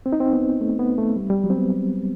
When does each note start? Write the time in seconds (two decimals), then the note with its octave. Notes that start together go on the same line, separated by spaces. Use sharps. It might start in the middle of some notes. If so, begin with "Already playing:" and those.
0.06 C4
0.13 D#4
0.20 C4
0.33 B3
0.61 A3
0.79 B3
0.98 A3
1.16 G3
1.30 G3
1.44 F#3
1.50 C4
1.57 B3